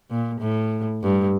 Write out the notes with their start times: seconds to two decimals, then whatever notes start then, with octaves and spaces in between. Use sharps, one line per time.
0.10 A#2
0.41 A2
1.03 G2